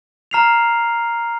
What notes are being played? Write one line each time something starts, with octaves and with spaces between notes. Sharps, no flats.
A#5 F6 C7 F7